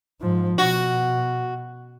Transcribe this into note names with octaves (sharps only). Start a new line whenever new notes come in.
G#2 F3
B2 F#4